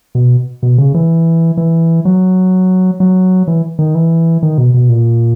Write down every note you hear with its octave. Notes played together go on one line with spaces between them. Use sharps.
B2
B2
C#3
E3
E3
F#3
F#3
E3
D#3
E3
D#3
B2
B2
A#2